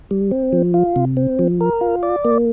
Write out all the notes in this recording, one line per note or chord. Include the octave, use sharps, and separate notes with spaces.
G3
C4
F3
F4
C3
C4
F3
A#4
F4
D5
A#3